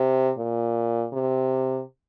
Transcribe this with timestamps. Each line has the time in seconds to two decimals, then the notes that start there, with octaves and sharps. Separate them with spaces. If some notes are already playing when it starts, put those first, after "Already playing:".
Already playing: C3
0.37 A#2
1.13 C3